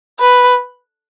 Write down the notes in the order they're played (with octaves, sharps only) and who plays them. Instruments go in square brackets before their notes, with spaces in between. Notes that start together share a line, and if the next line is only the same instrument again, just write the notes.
[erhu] B4